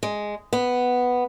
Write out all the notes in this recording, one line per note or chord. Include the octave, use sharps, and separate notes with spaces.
G#3
B3